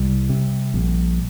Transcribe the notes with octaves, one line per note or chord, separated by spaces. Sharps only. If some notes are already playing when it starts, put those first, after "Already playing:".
Already playing: C2 G3
C3
A#1